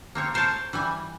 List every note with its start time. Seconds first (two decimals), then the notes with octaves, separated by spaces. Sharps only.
0.15 A#3 C4 C#5
0.34 A#4 C5 C#5 G#5 A5
0.73 E3 G3 G#5